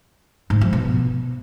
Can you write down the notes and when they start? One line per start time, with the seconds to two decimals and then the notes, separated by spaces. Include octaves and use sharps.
0.50 G#2
0.61 F3
0.73 B2